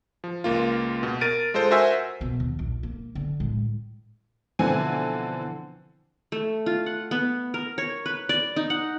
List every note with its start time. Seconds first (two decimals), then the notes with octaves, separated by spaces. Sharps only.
0.24 F3
0.44 C#2 A#3 F4
1.03 B2
1.21 A#4 A6 D7 D#7
1.54 G#3 F4 A4 C5
1.71 F#4 A#4 C5 E5 G#5 E6
2.21 B2
2.40 D#2
2.59 A#1
2.83 A#3
3.15 D3
3.40 A2 G#3
4.59 B2 D3 E3 F3 C4 G#5
6.32 A3
6.66 F4
6.86 F#5
7.11 B3
7.54 A#4
7.78 C#5
8.06 B4
8.29 D5
8.56 D#4
8.70 F#5